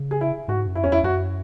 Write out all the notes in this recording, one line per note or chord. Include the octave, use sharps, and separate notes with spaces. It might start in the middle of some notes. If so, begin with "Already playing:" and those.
Already playing: C#3
G#4
E4
G#2 F#4
F#2
E4
E2 C#4
E4
F#2 F#4